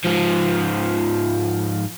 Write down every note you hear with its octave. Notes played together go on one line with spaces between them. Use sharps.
G#2 F3